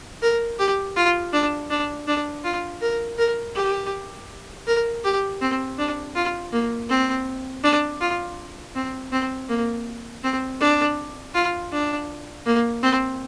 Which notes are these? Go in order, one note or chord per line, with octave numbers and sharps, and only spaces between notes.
A#4
G4
F4
D4
D4
D4
F4
A#4
A#4
G4
A#4
G4
C4
D4
F4
A#3
C4
D4
F4
C4
C4
A#3
C4
D4
F4
D4
A#3
C4